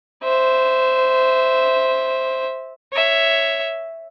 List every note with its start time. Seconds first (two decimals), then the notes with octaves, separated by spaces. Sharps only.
0.24 C5 E5
2.92 C#5 E5